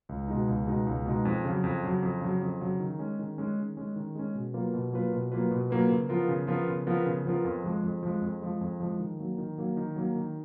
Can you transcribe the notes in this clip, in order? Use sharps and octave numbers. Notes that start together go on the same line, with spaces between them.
C#2
B2 G#3 D#4
C#2
B2 G#3 D#4
C#2
B2 G#3 D#4
F2
C#3 F#3
F2
C#3 F#3
F2
C#3 F#3
F2
C#3 F#3
D#3
G#3 C#4
D#3
G#3 C#4
D#3
G#3 C#4
D#3
G#3 C#4
B2
F#3 A#3 F4 B4
B2
F#3 A#3 F4 B4
B2
F#3 A#3 F4 B4
B2
F#3 A#3 F4 B4
C#3
F3 B3 F4 A#4
C#3
F3 B3 F4 A#4
C#3
F3 B3 F4 A#4
C#3
F3 B3 F4 A#4
F2
F3 G#3
F2
F3 G#3
F2
F3 G#3
F2
F3 G#3
D#3
F#3 A#3
D#3
F#3 A#3
D#3
F#3 A#3
D#3